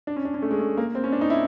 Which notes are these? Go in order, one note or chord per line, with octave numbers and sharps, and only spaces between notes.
D4
C#4
D4
C#4
A3
G#3
A3
A#3
C4
C#4
D4
D#4
E4